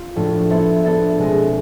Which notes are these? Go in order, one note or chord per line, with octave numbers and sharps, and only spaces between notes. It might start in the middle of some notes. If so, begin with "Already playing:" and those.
Already playing: F4
A2 F3 A3 D4 A4
B3 E4 A4 C5 E5
B3 D4 A4 E5
B2 G#3 C4